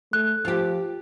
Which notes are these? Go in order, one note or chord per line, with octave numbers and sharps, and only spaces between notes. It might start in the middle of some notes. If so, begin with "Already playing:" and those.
A3 F#6
F3 F4 G4